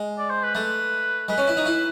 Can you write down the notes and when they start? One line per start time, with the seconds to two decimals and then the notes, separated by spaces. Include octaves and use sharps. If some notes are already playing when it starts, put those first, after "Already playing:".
Already playing: G#3
0.19 D5
0.30 C5
0.43 B4
0.55 A3 B4
1.28 G#3 B4
1.38 C#4
1.48 E4
1.57 D#4
1.66 E4